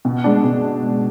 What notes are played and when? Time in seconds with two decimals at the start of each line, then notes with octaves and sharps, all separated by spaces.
0.05 B2
0.24 G#3 D4
0.44 B2